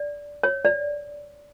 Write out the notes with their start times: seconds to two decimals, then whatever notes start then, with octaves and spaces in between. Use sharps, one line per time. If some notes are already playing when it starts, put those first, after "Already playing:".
Already playing: D5
0.43 C#5
0.65 D5